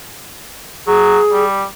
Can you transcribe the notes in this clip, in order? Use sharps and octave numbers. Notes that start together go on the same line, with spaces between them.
F#3 G#4
G3